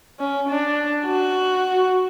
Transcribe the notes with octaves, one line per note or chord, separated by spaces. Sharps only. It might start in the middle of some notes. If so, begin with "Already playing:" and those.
C#4
D4
F#4